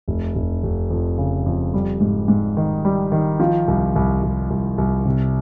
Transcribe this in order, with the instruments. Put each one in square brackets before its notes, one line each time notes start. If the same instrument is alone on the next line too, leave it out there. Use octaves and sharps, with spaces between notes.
[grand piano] F1
F1
F1
F2
C#3
F2
G3
G#2
G#2
D#3
G3
D#3
F3
C2
C2
C2
C2
C2
C3